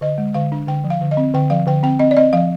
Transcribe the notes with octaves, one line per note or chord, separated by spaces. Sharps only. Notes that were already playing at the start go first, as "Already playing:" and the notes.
D3 D#5
G#3
D3 F5
D4
D3 G5
F3
F5
D3
D#5
C4
D3 G5
F3 F5
D3 G5
C4 G5
C4 D#5
D5
C4 D#5
F3 F5